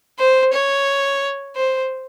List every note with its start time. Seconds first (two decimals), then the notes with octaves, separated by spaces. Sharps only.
0.19 C5
0.53 C#5
1.56 C5